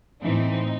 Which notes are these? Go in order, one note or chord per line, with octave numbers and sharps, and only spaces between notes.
A2 E3 C4 D#4